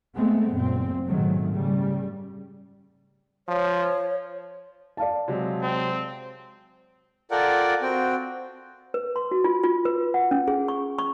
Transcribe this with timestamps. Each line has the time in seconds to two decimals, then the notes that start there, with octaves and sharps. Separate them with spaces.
0.16 G#3 A3 B3 C4
0.51 F#1 A#2 C4
1.08 G#2 B2 D#3 F#3 A3
1.52 C#3 G3
3.48 F3 C#5
4.97 D5 F5 A5
5.28 C3 F#3 G#3
5.62 C4
7.31 F4 A4 A#4 D5 F#5 G5
7.82 C4 F#4 G5
8.94 B4
9.16 C6
9.31 F#4
9.44 F4
9.63 F4
9.85 B4
10.14 F#5
10.31 C#4
10.48 G#4
10.68 C#6
10.99 C#6